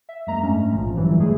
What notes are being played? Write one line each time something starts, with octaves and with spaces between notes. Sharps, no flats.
E5
F#2 G#3 A#3 A#5
G#2 G#3 A3 C#4 D4
A1 A#2 F3
G2 A#2 D3 E3 F#3 G3
G#3 A3 G#4